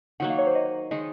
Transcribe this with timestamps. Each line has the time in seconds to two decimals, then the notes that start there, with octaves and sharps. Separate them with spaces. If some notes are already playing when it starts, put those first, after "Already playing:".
0.20 D#3 F#3 A#3 F#5
0.30 F5
0.38 C#5
0.47 C5
0.55 D#5
0.91 D#3 G#3 D#4 D#5